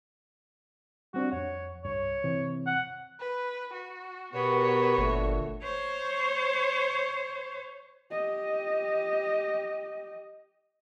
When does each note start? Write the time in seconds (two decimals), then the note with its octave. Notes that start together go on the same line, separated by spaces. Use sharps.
1.14 G3 C4 D4 F#4
1.32 F2 C#5 F#5
1.84 C2 G2 C#5
2.24 C3 E3 C4
2.67 F#5
3.20 B4
3.73 F#4
4.33 B2 B3 F#4 G4 A#4 C#5
4.98 G1 A#2 D3 A3
5.63 C5 C#5
8.11 G4 D#5